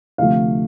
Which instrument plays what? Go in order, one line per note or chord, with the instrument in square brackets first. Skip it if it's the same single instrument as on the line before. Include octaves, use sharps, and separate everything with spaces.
[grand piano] D2 C3 F3 A3 F5